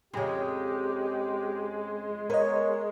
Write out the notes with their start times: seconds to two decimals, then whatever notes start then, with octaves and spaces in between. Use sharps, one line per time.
0.14 F2 C#3 G#3 G4
2.30 B3 A#4 C#5 D#5